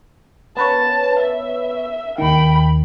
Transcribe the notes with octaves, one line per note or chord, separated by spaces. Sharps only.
B3 B4 C#5 A5
E5
D#2 D#3 G5 B5